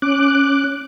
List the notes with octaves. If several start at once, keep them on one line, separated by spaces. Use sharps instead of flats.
C#4 D6 F#6